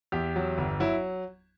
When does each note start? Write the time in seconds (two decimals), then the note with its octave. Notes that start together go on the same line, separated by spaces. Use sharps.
0.12 E2 G4
0.36 F#3
0.58 G1
0.80 F#3 E4